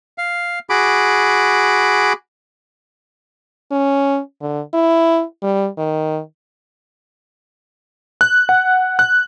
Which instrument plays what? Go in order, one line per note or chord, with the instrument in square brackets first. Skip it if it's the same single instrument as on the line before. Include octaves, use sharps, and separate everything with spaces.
[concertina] F5
F#4 G#4 B5 D6
[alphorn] C#4
D3
E4
G3
D#3
[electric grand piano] F#6
F#5
F#6